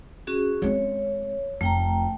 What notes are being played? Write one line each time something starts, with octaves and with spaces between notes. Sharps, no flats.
C#4 F#4 G#4
G#3 C4 C#5
F1 A3 G5 A#5